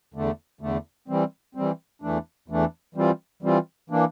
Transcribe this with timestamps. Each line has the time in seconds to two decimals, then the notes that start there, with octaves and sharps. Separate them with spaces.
0.14 E2 D3 A3
0.61 E2 D3 A3
1.08 E3 G3 C4
1.55 E3 G3 C4
2.02 E2 E3 A3 D4
2.48 E2 E3 A3 D4
2.95 E3 G3 C4 F4
3.42 E3 G3 C4 F4
3.90 E3 A#3 D4